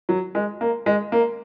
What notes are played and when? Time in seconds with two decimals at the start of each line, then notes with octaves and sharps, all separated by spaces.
0.09 F#3
0.35 G#3
0.61 A#3
0.86 G#3
1.12 A#3